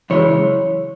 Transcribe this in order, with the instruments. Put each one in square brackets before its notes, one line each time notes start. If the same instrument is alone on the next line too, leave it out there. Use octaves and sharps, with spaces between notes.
[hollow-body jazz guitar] F#2 C#3 E3 G#3 C#5